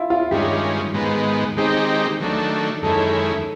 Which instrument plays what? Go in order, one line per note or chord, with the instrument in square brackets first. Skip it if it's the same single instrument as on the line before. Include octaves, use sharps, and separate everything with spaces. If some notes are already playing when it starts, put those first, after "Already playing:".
Already playing: [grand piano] E4 F4
F4
[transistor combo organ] G2 D#3 G#3 C#4 [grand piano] G4
[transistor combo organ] G#2 D#3 G#3 B3
[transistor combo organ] D#3 G#3 C4 D#4 G4 [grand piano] G#4
[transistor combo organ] D#3 F#3 A3 D4
[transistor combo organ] F#2 D#3 G#3 C#4 E4 [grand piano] A4